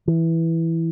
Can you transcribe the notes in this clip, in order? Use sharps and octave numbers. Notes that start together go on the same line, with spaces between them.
E3